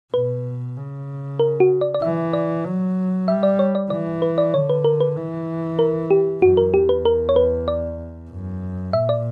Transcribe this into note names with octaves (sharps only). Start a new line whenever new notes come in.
B2 B4
C#3
A#4
F#4
D5
D5
E3 E5
D5
F#3
G3 E5
D5
C#5
D5
E3 D5
B4
D5
D3 C#5
B4
A#4
B4
E3
A#4
G4
F#2 F#4
A#4
E2 G4
B4
A#4
C#5
B4
D5
F#2
A#2 E5
D5